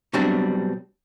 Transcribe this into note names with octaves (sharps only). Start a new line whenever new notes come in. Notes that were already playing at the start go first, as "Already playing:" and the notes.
B2 F#3 G3 C4 D4